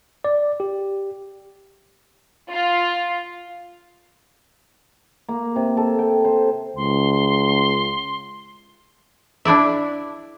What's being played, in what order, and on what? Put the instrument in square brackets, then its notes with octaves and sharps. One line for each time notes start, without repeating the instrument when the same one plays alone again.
[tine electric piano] D5
G4
[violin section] F4
[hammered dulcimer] A#3
C3
A4
G5
C5
[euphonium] C#2 [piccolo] C6
[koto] D4 E4 D5 E5